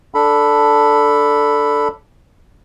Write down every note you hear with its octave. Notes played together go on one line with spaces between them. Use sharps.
D4 A4 B5